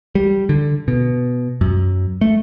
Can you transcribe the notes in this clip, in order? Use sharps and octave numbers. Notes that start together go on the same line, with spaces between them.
G3
D3
B2
F#2
A3